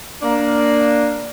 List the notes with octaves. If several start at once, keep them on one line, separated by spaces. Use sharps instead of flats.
A#3 D4